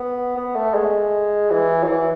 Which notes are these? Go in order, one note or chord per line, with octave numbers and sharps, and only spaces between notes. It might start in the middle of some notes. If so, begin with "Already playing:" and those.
Already playing: B3
B3
A3
G#3
E3
F#3
E3